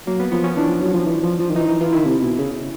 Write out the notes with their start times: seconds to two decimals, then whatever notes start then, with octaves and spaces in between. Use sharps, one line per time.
0.07 F#3 A#3
0.20 B3
0.32 F3 B3
0.44 C#4
0.57 E3 D4
0.69 F3
0.81 F#3
0.94 F3
1.06 E3
1.23 F3
1.39 F3
1.50 D#3
1.55 E3 D#4
1.68 E3 D#4
1.80 E3 F4
1.93 D#3 E4
2.05 C3
2.22 B2
2.39 C#3